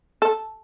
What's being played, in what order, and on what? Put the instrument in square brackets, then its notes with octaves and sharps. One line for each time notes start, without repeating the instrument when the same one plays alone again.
[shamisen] A4